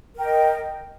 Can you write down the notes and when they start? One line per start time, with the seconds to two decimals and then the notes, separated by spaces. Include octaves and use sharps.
0.14 A#4
0.19 G5
0.23 D#5